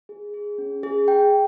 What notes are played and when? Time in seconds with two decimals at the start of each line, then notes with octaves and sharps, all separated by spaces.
0.09 G#4
0.34 G#4
0.58 C#4
0.83 G#4
1.08 G5